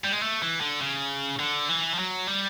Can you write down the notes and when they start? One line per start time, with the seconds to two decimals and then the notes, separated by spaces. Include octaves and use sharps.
0.05 G3
0.13 G#3
0.22 A3
0.43 E3
0.61 D3
0.81 C#3
1.40 D3
1.69 E3
1.94 F3
1.99 F#3
2.28 G3